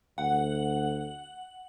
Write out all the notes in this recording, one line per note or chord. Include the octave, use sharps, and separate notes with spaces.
D2 F#5